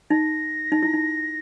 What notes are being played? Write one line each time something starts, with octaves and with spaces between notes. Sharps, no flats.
D#4 A#6
D#4
E4
D#4